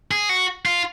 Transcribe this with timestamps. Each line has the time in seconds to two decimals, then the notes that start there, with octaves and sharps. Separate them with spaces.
0.11 G#4
0.29 F#4
0.66 F4